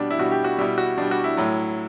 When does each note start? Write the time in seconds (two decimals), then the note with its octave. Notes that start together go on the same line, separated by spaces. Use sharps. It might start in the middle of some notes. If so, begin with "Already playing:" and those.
Already playing: B2 G3 D4
0.11 E4
0.19 B2 G3 F#4
0.31 G4
0.44 F#4
0.58 B2 G3 E4
0.78 F#4
0.97 B2 G3 D4
1.11 F#4
1.24 E4
1.37 A2 F#3